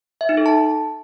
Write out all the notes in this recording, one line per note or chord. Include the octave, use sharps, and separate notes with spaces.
E5
D#4
A4
A5